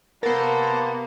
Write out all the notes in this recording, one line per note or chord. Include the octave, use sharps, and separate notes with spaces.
C3 A#3 B3 A4 A#4 C5